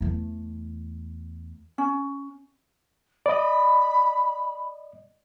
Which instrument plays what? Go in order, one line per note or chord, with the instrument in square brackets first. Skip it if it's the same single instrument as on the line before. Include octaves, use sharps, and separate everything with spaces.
[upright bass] E2 A3
[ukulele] C#4
[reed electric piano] D5 D#5 [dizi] B5